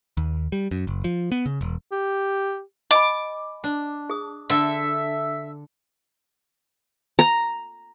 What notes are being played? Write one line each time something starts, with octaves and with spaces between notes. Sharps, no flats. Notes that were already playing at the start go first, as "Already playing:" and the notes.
D#2
G3
F#2
F#1
F3
B3
C#3
E1
G4
D#5 G#5 B5 D6
D4
G#4 D#6
D3 A4 E5
A#5